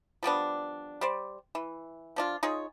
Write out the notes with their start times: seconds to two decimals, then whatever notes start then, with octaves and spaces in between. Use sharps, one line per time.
0.23 F3 G3 B3 D4
1.01 G3 C5 D5
1.55 E3
2.16 F3 D4 F4
2.43 D#4 F4 G#4 C#5